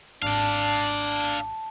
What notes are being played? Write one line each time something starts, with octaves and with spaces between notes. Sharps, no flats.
G#1 D#2 D4 D5 F5 A5